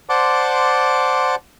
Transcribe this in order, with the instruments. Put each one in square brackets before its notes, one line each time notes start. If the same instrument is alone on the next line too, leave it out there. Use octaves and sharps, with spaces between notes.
[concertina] C5 D5 F#5 A5 C6 D6